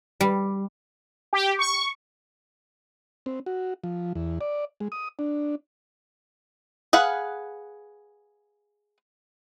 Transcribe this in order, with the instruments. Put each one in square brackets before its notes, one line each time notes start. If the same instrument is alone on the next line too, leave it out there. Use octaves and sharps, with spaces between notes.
[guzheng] G3
[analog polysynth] G4
C#6
[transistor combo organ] C4
F#4
F3
E2
D5
G#3
D#6
D4
[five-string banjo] G#4 B4 F5 F#5